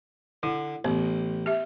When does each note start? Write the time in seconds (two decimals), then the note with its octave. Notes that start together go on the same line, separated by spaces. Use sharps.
0.43 D3 E4
0.85 A1 B3
1.46 G4 E5